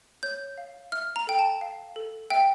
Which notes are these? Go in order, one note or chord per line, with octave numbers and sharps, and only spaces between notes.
C#5 G6
F5
E5 F6
A#5
A4 G5
A5
F5
A4
E5 G5